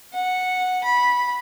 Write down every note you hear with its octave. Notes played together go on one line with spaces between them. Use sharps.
F#5
B5